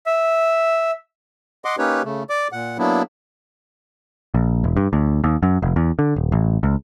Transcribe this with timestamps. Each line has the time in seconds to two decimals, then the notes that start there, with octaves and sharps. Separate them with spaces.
0.06 E5
1.65 D#5 F#5 C6 D6
1.78 A#3 C#4 D#4 G4 B4 C#5
2.04 C#3 A3
2.29 D5 D6
2.52 A#2 F#5
2.78 F#3 A#3 B3 D4 E4
4.34 A#1
4.64 E1
4.77 G2
4.93 D2
5.24 D#2
5.43 F#2
5.62 F1
5.76 E2
5.99 D3
6.16 D#1
6.32 A1
6.63 C#2